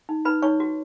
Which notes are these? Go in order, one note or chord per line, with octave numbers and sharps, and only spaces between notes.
D#4
D#4 B4 B5
D#4 C#5 C#6
F#4